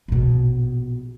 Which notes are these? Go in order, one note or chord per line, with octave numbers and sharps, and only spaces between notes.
A#1 B2